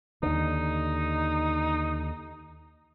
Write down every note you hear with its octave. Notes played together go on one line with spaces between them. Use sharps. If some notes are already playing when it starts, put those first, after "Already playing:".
D#2 D3 D#4